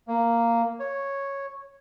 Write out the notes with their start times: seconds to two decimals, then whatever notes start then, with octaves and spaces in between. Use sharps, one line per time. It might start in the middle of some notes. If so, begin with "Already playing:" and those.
0.07 A#3
0.79 C#5